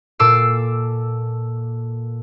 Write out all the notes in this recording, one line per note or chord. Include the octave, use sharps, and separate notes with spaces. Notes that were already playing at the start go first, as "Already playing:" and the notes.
A#2 A4 D6 E6 C7